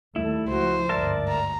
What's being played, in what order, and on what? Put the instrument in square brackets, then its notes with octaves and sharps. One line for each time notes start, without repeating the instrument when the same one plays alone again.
[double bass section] D#2 G3 A3 [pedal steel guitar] E4 [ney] A4
[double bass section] C#2 F3 [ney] F#4 [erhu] C5
[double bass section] G1 D2 G#2 [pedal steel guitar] A#4 E5 A5 [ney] D5
[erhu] A#5